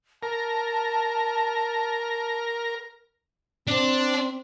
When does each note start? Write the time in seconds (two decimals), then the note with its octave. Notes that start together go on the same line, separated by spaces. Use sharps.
0.23 A#4 A5
3.68 C4 D4